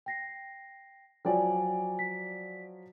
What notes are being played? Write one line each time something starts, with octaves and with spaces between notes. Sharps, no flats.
G5 A#6 C7
F3 F#3 D5 G5 G#5
B6